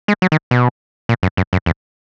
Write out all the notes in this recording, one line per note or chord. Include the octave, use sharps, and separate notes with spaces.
G#3
F#3
D#3
B2
A#2
F#2
F#2
F#2
E2